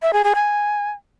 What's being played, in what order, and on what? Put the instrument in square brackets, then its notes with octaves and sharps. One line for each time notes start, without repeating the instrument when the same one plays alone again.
[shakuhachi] E5
G#4
G#4
G#5